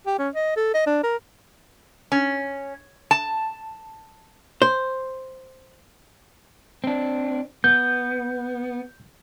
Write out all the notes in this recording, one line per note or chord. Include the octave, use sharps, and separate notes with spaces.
G4
C#4
D#5
A4
D#5
D4
A#4
C#4
A5
C5
C4 D4
B3 G6